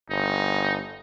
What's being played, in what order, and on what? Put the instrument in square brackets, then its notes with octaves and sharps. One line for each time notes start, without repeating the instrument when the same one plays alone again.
[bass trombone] G1 [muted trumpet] D#4